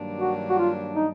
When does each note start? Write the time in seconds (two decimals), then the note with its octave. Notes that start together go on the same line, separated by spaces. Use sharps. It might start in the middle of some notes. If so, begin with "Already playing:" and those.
Already playing: G2 D#3 F#3 A#3 D4
0.21 F#4
0.50 F#4
0.59 F4
0.96 D#4